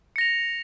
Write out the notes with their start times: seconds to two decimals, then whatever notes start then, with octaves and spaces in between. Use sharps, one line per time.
0.16 C#7
0.18 A#6
0.21 F7